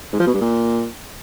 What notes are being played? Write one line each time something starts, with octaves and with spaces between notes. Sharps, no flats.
G#2
F3
B2
G2
A#2